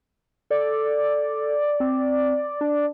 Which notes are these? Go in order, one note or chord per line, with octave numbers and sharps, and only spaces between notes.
A4 D5
C4
D4